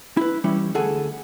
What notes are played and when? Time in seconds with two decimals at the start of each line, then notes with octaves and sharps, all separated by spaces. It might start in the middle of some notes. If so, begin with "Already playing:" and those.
0.17 E4 B4
0.44 E3 G3 C#4 E4
0.75 D2 G#4 A4 F#5 G#5